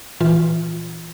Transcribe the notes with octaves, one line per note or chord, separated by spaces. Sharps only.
A#2 E3 F4